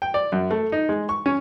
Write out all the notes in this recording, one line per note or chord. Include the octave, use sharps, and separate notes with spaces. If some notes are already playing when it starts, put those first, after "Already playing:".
G5
D5
F#2
A3
D#4
G#3
C#6
C#4